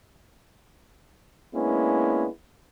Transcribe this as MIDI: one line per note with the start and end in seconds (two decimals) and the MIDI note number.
1.54 2.27 56
1.54 2.27 58
1.54 2.27 59
1.54 2.27 61
1.54 2.27 62
1.54 2.27 64